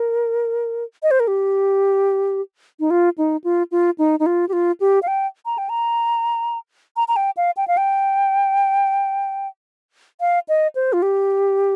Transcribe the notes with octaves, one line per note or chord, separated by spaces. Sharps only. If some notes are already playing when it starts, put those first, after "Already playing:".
Already playing: A#4
D#5
C5
A#4
G4
D#4
F4
D#4
F4
F4
D#4
D#4
F4
G4
F4
G4
F5
G5
A#5
G5
A#5
A#5
A#5
G5
F5
G5
F5
G5
F5
D#5
C5
F4
G4